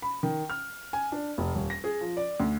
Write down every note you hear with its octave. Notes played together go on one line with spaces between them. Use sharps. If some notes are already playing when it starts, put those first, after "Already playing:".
B5
D#3
F6
G#5
D4
F1
D#1
A#6
G#4
F3
D5
D2